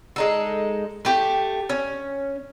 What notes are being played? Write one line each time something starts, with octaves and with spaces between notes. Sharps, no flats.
G#3 D#4 A4
A3 G4 G5
C#4